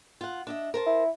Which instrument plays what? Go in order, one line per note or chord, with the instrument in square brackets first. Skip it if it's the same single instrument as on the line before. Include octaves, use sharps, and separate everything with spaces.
[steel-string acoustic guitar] F4 F#5
D4 D#5 E5
A#4 C5 A5
[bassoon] E4